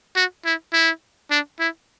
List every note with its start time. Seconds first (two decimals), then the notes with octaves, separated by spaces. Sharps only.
0.16 F#4
0.45 E4
0.73 E4
1.31 D4
1.59 E4